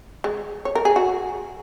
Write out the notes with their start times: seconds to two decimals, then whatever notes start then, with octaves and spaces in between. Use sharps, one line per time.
0.24 G#3
0.65 C#5
0.75 A#4
0.85 G#4
0.96 F#4